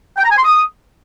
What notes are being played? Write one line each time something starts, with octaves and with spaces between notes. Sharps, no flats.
G5
A#5
G#5
C6
D#6